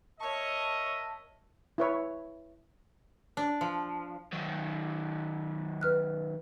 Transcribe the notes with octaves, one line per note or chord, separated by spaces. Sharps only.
A#4 C#5 D#5 E5 A5 C#6
E4 B4 C#5
D4
F3
D#3 F#3
B4 F6 F#6